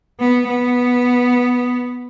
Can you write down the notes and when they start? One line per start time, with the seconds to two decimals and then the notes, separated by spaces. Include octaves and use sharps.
0.20 B3
0.48 B3